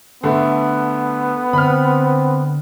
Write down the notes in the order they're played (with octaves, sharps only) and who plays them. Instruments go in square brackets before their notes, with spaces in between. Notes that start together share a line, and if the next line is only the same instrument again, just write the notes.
[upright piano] D3 A3 [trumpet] B3
[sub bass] D3 [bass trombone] C4 [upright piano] B5 F6